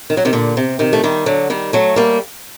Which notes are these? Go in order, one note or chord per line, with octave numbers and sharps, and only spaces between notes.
D#3
F#3
C3 D#3
A#2 D3
C3
C3 D#3
A3
D#3 G3
D3 F#3
D#3 G3
F#3 A3
G3 A#3